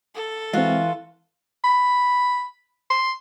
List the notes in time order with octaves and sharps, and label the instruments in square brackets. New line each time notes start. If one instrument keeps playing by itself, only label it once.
[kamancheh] A4
[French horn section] E3 [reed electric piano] G#3 C4 [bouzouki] F4 F#4
[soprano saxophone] B5
C6